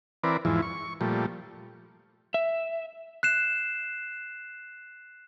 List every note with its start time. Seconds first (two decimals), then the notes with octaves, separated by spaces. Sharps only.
0.24 E3 C4 A#4 B4 D5
0.45 E2 G#2 E3 F3
0.62 C#6
1.01 A#2 F3 G3 A3
2.34 E5
3.23 F#6 C7 E7